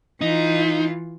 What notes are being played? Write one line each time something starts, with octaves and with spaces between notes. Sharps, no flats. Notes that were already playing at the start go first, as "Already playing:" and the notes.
E3 D#4 F4